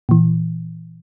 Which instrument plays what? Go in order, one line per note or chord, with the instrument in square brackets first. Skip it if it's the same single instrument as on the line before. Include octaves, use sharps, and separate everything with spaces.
[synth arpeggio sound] A#2 E3